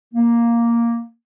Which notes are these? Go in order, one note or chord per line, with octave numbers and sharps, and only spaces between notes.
A#3